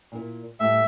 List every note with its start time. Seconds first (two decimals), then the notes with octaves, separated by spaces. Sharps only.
0.12 A#2 E4 A#4
0.60 A2 G3 A3 E5